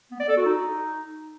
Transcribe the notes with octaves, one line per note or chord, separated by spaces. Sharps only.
B3
D5
A4
F#4
D#4